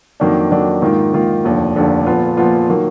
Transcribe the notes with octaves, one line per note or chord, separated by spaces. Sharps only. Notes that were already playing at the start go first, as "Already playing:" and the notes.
F2 D#3 F#3 A#3 D4
F2 D#3 F#3 A#3 D4
G#2 D#3 A#3 F4
G#2 D#3 A#3 F4
F1 D#2 D3 F3
F1 D#2 D3 F3
A#2 F3 B3 F4
A#2 F3 B3 F4
D#3 F#3 A#3